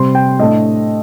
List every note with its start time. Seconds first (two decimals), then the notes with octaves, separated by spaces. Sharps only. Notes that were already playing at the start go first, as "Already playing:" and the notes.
Already playing: C3 G3 C4 C6
0.15 G5
0.39 A2 A3 D4 D#5